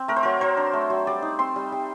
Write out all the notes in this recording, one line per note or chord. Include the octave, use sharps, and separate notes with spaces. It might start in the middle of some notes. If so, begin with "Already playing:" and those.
Already playing: C4
A3 A#4
C5
F#3 A#4
F#3 C5
D4
A3
F#3
G3 D5
D#4
C4 C6
G3
G3